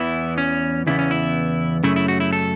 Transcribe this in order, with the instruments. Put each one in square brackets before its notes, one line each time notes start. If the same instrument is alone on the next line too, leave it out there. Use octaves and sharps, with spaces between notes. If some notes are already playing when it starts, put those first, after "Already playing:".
Already playing: [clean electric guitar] E2 E3 B3 E4
C#4
E2 C#3 E3 B3 E4
C#4
E4
F#2 C#3 A3 E4
E4
F#4
E4
A4